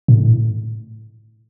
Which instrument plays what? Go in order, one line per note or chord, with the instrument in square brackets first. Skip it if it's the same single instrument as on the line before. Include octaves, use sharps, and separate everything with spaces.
[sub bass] A2